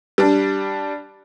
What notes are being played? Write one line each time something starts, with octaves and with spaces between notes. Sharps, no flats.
G3 D4